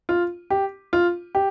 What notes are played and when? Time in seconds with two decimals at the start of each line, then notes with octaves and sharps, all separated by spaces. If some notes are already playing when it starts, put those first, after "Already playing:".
0.09 F4
0.50 G4
0.93 F4
1.35 G4